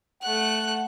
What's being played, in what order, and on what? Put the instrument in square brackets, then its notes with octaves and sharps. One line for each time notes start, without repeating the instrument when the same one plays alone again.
[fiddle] A3 F#6 [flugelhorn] F#5